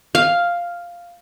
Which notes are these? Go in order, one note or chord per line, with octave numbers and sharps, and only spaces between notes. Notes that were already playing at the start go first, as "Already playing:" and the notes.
F5